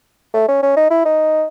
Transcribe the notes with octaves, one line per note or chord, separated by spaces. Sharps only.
A3
C#4
C#4
D#4
E4
D#4